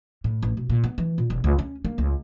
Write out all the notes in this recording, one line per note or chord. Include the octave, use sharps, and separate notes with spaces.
A2
A1
B2
A#2
B3
E3
A#2
E1
C#2
C#4
A#3
C#2